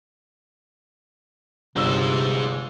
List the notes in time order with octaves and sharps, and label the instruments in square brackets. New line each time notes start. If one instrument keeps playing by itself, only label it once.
[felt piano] G1 E6 [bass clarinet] C3 [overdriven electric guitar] G#3 C5